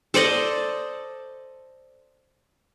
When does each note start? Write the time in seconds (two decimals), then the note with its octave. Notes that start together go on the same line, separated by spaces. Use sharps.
0.14 A4 C5 D5 D#5